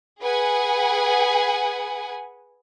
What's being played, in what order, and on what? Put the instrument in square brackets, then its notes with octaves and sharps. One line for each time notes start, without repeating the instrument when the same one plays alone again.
[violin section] G#4 B4 F#5 G#5